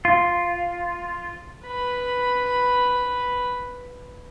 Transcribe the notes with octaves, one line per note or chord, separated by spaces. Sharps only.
F4
B4 B5